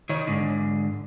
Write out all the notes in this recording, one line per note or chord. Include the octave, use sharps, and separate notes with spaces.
D#3 C#5
G#2 D3